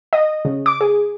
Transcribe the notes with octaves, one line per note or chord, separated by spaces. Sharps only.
D#5
C#3
D6
G#4